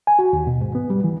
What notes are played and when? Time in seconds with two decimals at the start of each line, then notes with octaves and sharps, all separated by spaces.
0.07 G#5
0.19 F#4
0.33 D#2
0.47 B2
0.61 G#2
0.75 B3
0.90 G3
1.04 E3